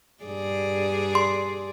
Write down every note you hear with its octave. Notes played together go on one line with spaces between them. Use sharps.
G2 G#4 D5
C6